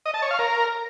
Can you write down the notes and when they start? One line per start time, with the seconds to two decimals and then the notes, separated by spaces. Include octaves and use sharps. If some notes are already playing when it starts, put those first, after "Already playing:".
0.06 D#5
0.14 A5
0.22 C#5
0.31 F5
0.39 A#4